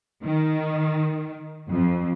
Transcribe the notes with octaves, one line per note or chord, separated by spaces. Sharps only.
D#3
F2